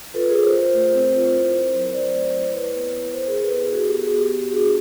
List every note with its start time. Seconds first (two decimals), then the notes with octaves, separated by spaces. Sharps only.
0.14 F4 A4 B4
0.29 G#4 A#4
0.35 F4
0.44 A#4 C5
0.54 F4 A#4 C5
0.74 A3
0.94 C4
1.14 F4
1.33 E4
1.53 C4
1.74 F#3
1.93 C4 C5 D5
2.13 A3
2.33 E4
2.52 E4 B4 C#5
2.73 B3
2.93 E4
3.13 E4 A#4 C5
3.27 G#4 A#4
3.33 E4
3.43 A4 B4
3.52 B3
3.57 G#4 A#4
3.72 B3 F#4 G#4
3.87 B3 G4 A4
4.02 F#4 G#4
4.12 B3
4.17 G4
4.32 F#4 G4
4.51 D4 F#4 G#4